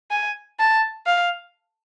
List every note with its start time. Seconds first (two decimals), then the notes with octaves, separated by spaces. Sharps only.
0.11 G#5
0.59 A5
1.07 F5